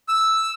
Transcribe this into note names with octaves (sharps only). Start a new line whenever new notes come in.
E6